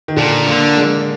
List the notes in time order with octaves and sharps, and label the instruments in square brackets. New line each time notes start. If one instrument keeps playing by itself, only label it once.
[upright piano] D#3
[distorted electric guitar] A#2 [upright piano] D3
[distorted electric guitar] D3 [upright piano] A#3
[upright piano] G#3